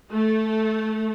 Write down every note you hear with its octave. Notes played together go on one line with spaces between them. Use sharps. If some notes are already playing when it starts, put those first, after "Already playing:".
A3